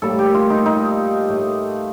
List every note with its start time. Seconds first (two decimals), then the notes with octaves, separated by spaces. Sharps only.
0.02 A2 G3 A#3 A4
0.19 G4
0.34 F4
0.50 D#4
0.66 D#4
1.29 A2 A3